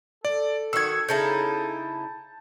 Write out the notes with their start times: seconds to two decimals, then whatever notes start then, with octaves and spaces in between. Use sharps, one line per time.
0.25 A4 D5
0.73 D#3 F#4 E6 G#6
1.09 C#3 D#4 E4 A5 G6